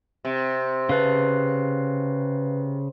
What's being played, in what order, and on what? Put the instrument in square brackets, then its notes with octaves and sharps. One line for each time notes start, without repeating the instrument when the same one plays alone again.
[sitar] C3
[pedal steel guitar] C#3 A5 [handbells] B4 F5